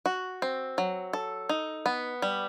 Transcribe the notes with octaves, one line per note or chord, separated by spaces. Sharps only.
F#4
C4
F#3
A4
D#4
B3
G3